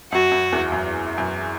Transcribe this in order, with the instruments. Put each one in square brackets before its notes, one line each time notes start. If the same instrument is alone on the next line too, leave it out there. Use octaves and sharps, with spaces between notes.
[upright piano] F#2 [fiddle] F#4
[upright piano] F#2
E2
F#2
F#2